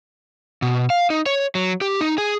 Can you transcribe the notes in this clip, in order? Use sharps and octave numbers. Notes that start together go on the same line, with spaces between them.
B2
F5
D#4
C#5
F#3
G4
D#4
G#4